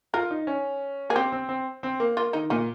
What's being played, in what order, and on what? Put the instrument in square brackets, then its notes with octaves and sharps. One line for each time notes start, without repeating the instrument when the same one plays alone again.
[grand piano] F4 [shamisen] A#4
[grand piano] D#4
C#4
[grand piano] A#3 [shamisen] G#4
[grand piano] C4 [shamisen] G4
[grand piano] C4
C4
C4
A#3
[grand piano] A#3 [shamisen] F4
[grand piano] D#3 [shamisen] D#4
[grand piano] A#2 [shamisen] D#4